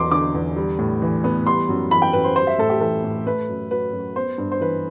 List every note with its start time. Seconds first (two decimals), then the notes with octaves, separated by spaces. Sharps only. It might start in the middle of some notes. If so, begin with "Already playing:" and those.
Already playing: E2 F#3 C6 D6
0.11 D3 D6
0.35 E2
0.56 G3
0.79 A2
1.02 E3
1.24 B3
1.47 G3 C6
1.69 F#2
1.91 E3 B5
2.02 G5
2.13 F#2 B4
2.24 C5
2.36 G3 C5
2.47 E5
2.58 A2 A4
2.70 G4
2.81 E3 A4
3.04 A2
3.27 A3 B4
3.49 F#2
3.71 F#3 B4
3.93 F#2
4.16 B3 C5
4.38 G2
4.52 C5
4.60 E3 B4